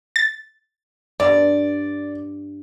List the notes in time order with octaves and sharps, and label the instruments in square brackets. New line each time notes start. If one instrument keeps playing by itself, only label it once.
[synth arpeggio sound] A6
[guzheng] G2 [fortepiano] D5